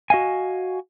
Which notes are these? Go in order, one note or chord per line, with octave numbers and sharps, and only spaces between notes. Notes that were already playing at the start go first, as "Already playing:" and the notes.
F#4 D#5 F5 G#5